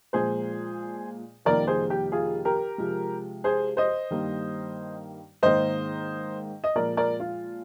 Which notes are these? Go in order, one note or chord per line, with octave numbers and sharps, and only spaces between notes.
A#2 F3 G#3 G#4 C5
F2 C3 D#3 G3 A#3 A#4 D5
G#4 C5
G4
F4 G#4
G4 A#4
C3 F3 G#3
G#4 C5
C5 D#5
G2 D#3 G3 A#3
G#2 D#3 A#3 C5 D#5
D#5
A#2 F3 G#3 A#4 D5
A#4 D5
F4